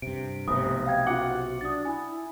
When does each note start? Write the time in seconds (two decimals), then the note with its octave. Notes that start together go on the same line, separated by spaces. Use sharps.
0.02 G2 C3 D7
0.48 F1 B1 C3 D#6
0.86 F5 G5 G#6
1.07 F4 F#4 F#5 D6
1.61 D4 D#6 A6
1.85 E4 G#5